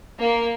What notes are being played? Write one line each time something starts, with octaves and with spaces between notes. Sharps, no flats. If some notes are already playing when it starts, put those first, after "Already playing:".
A#3